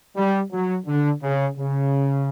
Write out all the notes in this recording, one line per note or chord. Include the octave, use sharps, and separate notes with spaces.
G3
F#3
D3
C#3
C#3